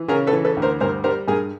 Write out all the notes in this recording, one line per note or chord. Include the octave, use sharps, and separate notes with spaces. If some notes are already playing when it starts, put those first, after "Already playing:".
Already playing: E3
C#3 G#4 A#4
A4 B4
E3
A4 B4
D2
A#4 C5
G2 A#4 C5
G3 A#4 C5
G2 G#4 A#4